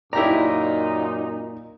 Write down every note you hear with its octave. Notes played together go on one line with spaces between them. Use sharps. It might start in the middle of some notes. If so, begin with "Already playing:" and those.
F#2 A#2 D#4 E4 G4 A#4 D5 A#5